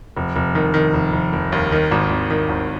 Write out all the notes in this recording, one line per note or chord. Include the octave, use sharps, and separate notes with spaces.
F1
F1
D#3
D#3
F1
F1
F1
D#2
D#3
G#1
G#1
D#3
G#1